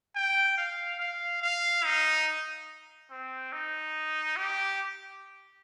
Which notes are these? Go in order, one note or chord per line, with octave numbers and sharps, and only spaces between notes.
G5
F5
F5
F5
D#4
C4
D#4
G4